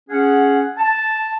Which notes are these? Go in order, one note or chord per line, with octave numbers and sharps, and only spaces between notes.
C#4 G#4 F#5
A5